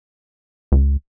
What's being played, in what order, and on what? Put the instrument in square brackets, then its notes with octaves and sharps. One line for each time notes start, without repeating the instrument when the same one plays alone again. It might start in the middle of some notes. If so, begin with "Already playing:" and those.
[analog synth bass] C#2